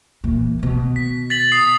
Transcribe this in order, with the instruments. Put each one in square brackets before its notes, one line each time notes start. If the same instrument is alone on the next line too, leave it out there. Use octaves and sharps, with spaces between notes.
[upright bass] A#2 E3
B2 D#3
[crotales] B6
A6 B6 F#7
D#6 C7